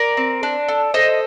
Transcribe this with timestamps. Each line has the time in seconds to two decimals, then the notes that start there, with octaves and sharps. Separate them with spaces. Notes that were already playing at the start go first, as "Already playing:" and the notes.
Already playing: A#4 D5
0.17 C4
0.43 D4
0.68 A4
0.94 A4 C5 D#5